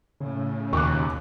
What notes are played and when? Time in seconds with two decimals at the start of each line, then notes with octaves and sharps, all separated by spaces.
0.21 A2 C#3
0.73 D#2 B2 C#6 D6 F#6